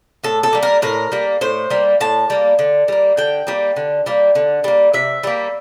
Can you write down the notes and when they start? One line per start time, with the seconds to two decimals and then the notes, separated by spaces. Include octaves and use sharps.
0.24 A2 A4
0.43 A4
0.53 G3 A#3
0.63 A#4
0.82 A2 A#4
1.12 G3 A#3
1.41 A2 C5
1.70 G3 A#3
2.01 A2 A5
2.30 G3 A#3
2.59 D3
2.88 G3 A#3
3.17 D3 G5
3.47 G3 A#3
3.76 D3
4.06 G3 A#3
4.35 D3
4.64 G3 A#3
4.94 C3 E5
5.23 G3 A#3